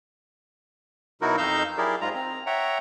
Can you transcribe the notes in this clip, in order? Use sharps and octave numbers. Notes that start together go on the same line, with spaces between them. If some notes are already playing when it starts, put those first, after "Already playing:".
B2 F#3 D#4 E4 F#4 A#4
F2 D#4 D#5 F5 E6 G6
F#3 E4 G4 G#4 A#4 D5
G#2 G#3 F4 A#5
C4 A#5
C#5 E5 F#5 G5 A#5